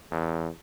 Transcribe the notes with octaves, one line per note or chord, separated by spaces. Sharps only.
E2